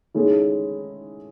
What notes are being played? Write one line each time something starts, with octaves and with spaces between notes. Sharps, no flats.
D#3 G#3 C#4 E4 A4